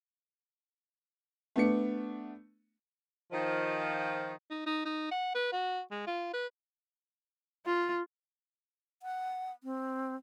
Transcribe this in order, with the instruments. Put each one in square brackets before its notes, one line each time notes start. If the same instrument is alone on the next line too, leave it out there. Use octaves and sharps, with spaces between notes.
[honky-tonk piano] A3 B3 D4 C#7
[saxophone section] D#3 F3
[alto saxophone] D#4
D#4
D#4
F#5
B4
F#4
G#3
F4
B4
[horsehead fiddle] F4
[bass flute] F#5
C4